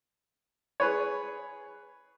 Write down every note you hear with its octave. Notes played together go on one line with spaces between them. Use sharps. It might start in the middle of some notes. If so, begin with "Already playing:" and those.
G#4 B4 C#5